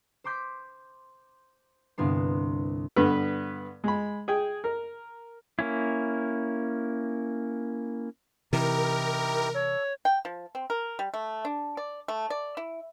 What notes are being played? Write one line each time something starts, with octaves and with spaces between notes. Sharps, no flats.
C5 C6 D6 G6 B6
C2 G2 D3 B3 C6
G2 D3 B3 B4
G#3 B5
G#4 G5
A#4
A#3 C#4 E4
C3 E3 D#4 E4 G4 A#4
A4 C#5
G5
F3
C4
A#4
G3
A3
D4
D5
A3
D5
E4